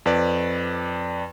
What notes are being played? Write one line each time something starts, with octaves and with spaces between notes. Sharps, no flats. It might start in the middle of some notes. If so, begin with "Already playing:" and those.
F2 B4 D5